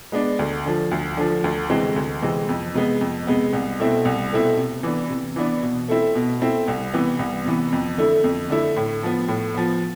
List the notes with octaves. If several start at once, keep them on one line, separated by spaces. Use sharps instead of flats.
G#3 B3 D4
D2
D3 F3
D2
D3 F3
D2
C3 E3 G#3 C4
D2
C3 E3 G#3 C4
F2
C3 G#3 B3
F2
C3 G#3 B3
C2
B2 A3 C4 E4
C2
B2 A3 C4 E4
C3
E3 B3 D4
C3
E3 B3 D4
B2
A3 C4 E4
B2
A3 C4 E4
C2
C3 E3 B3
C2
C3 E3 B3
F2
D3 A3 E4
F2
D3 A3 E4
A2
F3 B3
A2
F3 B3